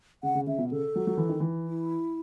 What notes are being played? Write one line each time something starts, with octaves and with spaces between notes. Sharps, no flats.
C#3 F#5
C#3
C#3 E5
B2
C#3 A4
F#3
F#3
E3
D#3
E3
E4